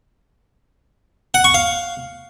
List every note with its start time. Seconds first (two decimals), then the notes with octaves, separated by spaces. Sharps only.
1.34 F#5
1.44 C#6
1.54 F5